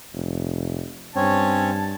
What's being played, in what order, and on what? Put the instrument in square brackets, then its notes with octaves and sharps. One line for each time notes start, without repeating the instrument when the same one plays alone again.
[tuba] F1
[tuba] G2 [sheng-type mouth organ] C4 C#4 C#5 [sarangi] A5